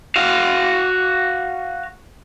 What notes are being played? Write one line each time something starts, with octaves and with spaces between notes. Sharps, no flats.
F#4 F5